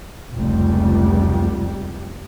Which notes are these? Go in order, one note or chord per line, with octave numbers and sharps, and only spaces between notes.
F1 C#2 G3